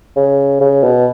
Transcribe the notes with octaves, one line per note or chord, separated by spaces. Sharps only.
C#3
C#3
B2